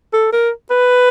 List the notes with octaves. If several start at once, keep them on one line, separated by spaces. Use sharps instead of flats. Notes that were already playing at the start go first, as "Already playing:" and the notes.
A4
A#4
B4